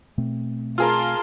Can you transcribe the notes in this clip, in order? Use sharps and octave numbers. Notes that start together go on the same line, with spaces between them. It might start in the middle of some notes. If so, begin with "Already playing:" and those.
B2 A3 C4
F4 G#4 A#4 A5 C6